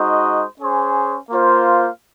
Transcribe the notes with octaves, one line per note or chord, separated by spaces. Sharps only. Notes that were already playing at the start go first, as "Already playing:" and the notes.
Already playing: G#3 D#4 F#4 C5 D#5
C#4 G#4 C5
A#3 F4 C5 F5